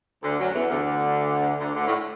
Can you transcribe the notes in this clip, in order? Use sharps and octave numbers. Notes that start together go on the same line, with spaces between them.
D2 D3
F#2 F#3
E2 E3
D2 D3
D2 D3
D2 D3
A2